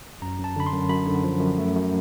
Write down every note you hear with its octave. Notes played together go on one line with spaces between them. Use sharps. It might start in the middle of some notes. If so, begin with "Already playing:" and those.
F#2 A#5
F#2 A5
D3 B5
C6
F#2
F#2 B5
D3
F3
F#2
A3
F#2